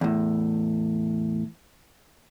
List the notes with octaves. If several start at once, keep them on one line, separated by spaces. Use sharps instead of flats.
E2 A2